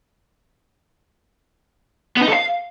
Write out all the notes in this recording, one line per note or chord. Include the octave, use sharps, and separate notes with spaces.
B3
D#4
A4
F5